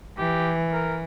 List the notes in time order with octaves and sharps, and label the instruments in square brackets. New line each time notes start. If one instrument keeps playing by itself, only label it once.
[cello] E3 [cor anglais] G4
[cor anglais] A#4